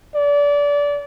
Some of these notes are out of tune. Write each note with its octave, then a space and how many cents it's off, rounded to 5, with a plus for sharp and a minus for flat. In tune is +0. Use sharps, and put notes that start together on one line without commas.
D5 -25